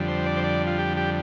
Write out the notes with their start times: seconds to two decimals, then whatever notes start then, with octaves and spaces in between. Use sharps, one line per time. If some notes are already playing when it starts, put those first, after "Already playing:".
Already playing: F2 D3 G3
0.08 C5
0.26 D5
0.37 C5
0.44 D5
0.67 F4
0.79 G4
0.97 G4